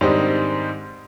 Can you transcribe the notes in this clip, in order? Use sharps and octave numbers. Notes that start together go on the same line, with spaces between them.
G#2 D#3 G3 C4 D4 D#4